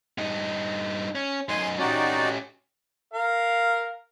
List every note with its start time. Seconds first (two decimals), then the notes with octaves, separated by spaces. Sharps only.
0.18 G2 D#4
1.15 C#4
1.49 F#2 D#4 G#5 C6
1.79 C#4 D#4 F#4 G4 D5
3.14 A#4 F5